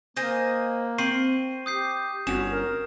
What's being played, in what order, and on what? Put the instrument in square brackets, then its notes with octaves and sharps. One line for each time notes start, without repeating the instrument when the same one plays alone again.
[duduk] A#3 [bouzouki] C5 D#5 G#5
[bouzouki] C4 [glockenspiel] C#6 C7 D#7
[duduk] G4 [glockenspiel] D#6 G6 C7
[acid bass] G1 [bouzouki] C#4 [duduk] F#4 [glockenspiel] E7
[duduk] A#4